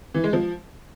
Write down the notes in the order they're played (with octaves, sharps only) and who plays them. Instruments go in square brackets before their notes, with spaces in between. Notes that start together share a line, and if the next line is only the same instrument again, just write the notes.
[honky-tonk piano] E3
G#3
F3